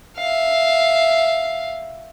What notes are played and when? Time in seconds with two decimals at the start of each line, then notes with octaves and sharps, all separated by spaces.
0.17 E5 F5